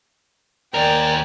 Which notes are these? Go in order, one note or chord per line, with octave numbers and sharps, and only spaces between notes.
D#2 A#4 D5 G5 G#5